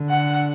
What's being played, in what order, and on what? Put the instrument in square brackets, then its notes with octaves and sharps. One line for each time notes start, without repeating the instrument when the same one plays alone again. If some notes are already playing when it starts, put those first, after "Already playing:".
Already playing: [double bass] D3
[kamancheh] F#5